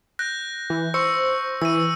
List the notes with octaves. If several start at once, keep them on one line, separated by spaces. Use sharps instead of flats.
F#6 G6 A#6
E3
C5 C#6 E6 C#7
E3 E6 D#7